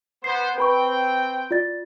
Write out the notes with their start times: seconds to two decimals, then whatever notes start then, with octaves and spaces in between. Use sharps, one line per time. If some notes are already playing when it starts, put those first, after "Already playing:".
0.24 B3 C5 C7
0.58 C4 B4 G5 B5 C#6
1.51 F4 D5 A6